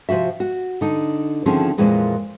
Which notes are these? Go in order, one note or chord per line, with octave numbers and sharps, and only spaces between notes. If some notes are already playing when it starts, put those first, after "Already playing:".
C3 F3 F#4 E5
F#4
D3 D#4
D3 D#3 F3 C4 C#4 G#4
F2 A#2 E3 G#3 A#3